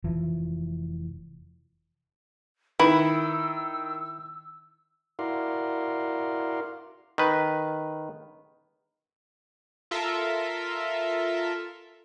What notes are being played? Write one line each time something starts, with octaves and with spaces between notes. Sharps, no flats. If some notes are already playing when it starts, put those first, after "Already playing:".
F1 E3 F3
D#3 E4 B4 E6
E4 F#4 A#4 D5 F5 C6
D#3 B4
F4 A4 A#4 E5